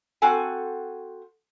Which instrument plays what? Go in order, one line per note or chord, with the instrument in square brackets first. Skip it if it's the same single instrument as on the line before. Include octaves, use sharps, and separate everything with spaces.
[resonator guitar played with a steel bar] C4 F#4 A4 G#5